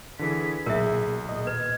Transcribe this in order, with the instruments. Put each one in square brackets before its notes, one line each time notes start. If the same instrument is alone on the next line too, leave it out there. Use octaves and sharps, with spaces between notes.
[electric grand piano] D3 E3 G#4 [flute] B6
[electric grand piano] B1 [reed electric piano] A#2 [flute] G#4 [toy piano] A#4 E5
[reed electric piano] D#2 A#2 D#5
[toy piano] B4 [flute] G#6